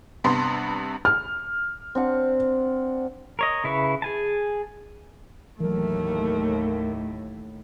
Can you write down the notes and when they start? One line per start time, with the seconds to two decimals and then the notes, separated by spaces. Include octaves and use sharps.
0.24 G2 C3 B3 B5 C6
1.05 F6
1.95 C4 D4 F#5
3.39 A#4 C#5 D#5
3.64 C#3 E4 B4 C#6
4.02 G#4 G#5 A5
5.60 D#2 A2 E3 F#3 A3 A#4